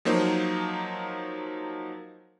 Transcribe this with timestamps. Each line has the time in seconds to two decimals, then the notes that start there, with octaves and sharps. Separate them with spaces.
0.05 F3 F#3 A#3 D#4 C5